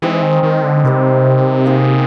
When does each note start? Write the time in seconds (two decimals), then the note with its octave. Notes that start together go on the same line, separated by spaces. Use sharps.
0.02 E3 G#3 C4 D#4 G#4
0.23 D#3
0.43 D#3
0.63 D3
0.84 C3 D#3 G3 C4
1.66 A#3 D#4 G#4